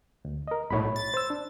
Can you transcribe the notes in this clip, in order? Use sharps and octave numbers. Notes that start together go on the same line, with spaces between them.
D2
A#4 D#5
B1 A2 C#5 B5
A6
C5 E6
D4